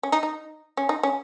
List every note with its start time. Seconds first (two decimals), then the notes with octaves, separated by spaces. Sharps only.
0.03 C#4
0.12 D#4
0.23 D#4
0.77 C#4
0.89 D#4
1.03 C#4